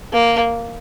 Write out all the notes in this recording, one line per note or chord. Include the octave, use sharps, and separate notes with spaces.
A#3